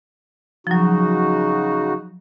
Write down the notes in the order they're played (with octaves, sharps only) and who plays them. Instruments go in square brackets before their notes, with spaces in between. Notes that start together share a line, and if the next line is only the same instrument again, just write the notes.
[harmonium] C#3 D#4 F#4 [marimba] F3 F#3